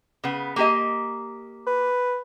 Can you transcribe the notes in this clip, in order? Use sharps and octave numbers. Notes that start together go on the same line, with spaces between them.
C#3 B3
A#3 G4 D#5
B4